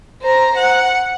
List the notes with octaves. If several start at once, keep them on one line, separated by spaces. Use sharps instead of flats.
C5 A#5
F#5